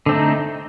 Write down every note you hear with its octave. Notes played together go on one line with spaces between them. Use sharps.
D3 A3 C4 D#4